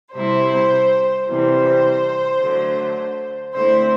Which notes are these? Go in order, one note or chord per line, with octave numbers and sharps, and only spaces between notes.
C3 G3 C4 E4 C5
C3 E3 G3 C4 C5
D3 F#3 A3
D3 A3 C4 E4 C5